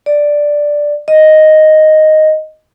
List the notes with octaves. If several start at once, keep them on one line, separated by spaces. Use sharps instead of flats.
D5
D#5